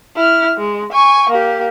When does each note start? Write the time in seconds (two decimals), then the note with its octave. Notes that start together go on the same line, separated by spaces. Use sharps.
0.16 E4 F6
0.58 G#3
0.93 G#5 C#6
1.30 A#3 G4